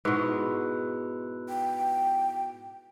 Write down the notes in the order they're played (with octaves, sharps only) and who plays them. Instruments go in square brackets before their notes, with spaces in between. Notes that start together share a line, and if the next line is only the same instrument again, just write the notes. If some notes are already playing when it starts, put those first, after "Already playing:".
[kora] G#2 B2 [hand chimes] E4 F#4 E6 [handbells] B4
[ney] G5